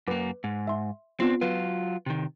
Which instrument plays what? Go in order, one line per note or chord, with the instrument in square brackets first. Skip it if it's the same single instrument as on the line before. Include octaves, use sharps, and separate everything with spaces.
[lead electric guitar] F#2 A#3 [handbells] B4 D6
[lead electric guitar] G#2
[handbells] E5 C6
[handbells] B3 F4 C7 [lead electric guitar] C4 D4
[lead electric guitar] F#3 F4 [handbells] B4
[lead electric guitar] C3 D#3